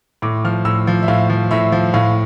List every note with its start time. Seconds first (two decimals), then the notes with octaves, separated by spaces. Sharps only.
0.22 A2 D6
0.44 F3 F6
0.65 A2 E6
0.87 F3
1.03 E5
1.08 A2 F5
1.30 F3
1.51 A2 E5
1.72 F3
1.94 A2 F5